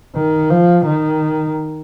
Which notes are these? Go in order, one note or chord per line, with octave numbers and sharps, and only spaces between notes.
D#3
F3
D#3